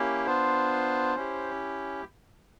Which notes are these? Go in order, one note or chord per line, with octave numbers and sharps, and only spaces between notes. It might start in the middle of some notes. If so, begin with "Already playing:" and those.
Already playing: A#3 C#4 E4 G4
B3 D4 F4 C5
C#4 E4 G4